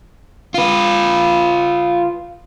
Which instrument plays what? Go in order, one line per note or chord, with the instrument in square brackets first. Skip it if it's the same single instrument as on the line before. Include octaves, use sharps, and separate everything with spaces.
[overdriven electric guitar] F4 B4